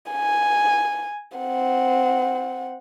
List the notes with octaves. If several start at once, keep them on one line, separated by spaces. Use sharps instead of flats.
G#5
C4 F#5